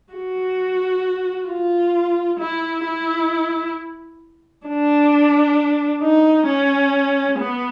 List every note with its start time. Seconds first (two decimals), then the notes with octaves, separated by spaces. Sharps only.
0.13 F#4
1.48 F4
2.40 E4
2.85 E4
4.67 D4
6.02 D#4
6.48 C#4
7.38 B3